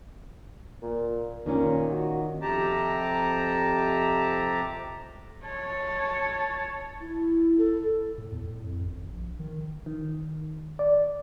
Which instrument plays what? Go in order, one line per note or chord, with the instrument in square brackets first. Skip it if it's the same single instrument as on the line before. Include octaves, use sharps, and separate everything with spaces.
[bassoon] A#2
[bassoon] A#2 [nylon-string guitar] D#3 A#3 C#4
[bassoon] F#4
[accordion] F2 C3 G4 A5 A#5
[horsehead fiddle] C#5 A5
[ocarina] E4
A4
[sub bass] A2
E2
A2
F2
G#1
A#1
D#3
[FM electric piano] D#3
D5